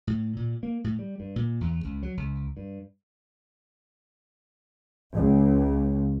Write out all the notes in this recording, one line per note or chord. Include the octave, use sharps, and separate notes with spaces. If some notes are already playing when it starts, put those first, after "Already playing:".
A2
A#2
A#3
A2
G3
G2
A#2
E2
C#2
F#3
C#2
G2
C#2